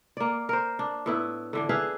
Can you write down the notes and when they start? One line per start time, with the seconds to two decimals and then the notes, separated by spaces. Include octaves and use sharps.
0.17 A#3 D5
0.49 A#4 C5
0.79 D4
1.06 A2 B3 E4
1.53 D3 E3 D4
1.69 E4 G#4 B4 F5